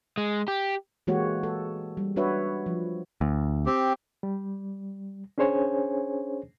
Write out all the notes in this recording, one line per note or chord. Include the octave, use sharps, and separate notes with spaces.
G#3
G4
E3 G#3 A#3 F#4 G4 C#5
A4
G3
D4 F#4 B4 C#5 E5
F3
D2
C4 G4
G3
C#4 D4 G#4 C5 C#5 G#5